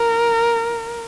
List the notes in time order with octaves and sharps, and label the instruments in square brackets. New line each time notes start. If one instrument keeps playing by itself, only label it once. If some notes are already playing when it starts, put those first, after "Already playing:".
Already playing: [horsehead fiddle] A#4